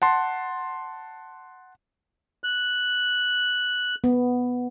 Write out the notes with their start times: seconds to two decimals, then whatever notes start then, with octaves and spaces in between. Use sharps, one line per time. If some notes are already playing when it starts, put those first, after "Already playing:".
0.02 F#5 A5 C6
2.44 F#6
4.04 B3